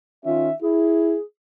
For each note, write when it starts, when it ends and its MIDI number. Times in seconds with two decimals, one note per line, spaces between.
0.25 0.48 51
0.25 0.48 61
0.25 0.48 65
0.25 0.54 76
0.62 1.15 64
0.62 1.23 68